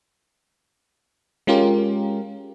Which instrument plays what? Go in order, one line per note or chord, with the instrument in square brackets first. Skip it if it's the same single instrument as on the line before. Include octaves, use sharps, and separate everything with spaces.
[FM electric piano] G#3 C#4 F4 G4 A#4